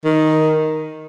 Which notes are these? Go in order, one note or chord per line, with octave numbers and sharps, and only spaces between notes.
D#3